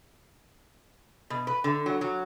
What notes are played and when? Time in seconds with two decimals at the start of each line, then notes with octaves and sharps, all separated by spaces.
1.30 B2
1.47 B4
1.64 D3
1.86 F#3
2.01 F#3